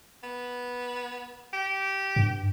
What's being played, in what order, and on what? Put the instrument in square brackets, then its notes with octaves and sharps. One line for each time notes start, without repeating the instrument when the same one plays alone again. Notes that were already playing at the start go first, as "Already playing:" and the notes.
[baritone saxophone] B3
G4
[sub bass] G2